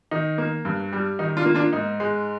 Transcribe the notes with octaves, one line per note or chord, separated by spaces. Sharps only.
D#3 D#4
A#3
G2
G3
D#3 D#4
D4 F4
A#3
D4 F4
G#2 D#4
G#3